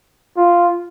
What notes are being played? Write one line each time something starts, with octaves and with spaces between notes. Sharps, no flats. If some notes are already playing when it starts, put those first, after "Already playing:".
F4